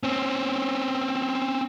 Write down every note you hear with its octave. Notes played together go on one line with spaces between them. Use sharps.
C4 C#4